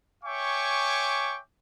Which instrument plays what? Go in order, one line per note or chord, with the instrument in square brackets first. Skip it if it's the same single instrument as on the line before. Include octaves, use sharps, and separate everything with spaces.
[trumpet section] C#5 E5 G5 G#5 C#6 D6